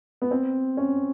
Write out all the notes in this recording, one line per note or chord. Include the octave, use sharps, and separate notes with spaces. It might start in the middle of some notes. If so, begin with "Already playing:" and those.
B3
C4
C#4